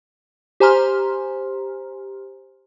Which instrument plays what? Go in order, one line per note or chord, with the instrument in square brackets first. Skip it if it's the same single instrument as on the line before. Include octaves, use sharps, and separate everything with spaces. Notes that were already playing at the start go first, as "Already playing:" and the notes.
[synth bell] G4 C5 G#5 A#5 C6 F6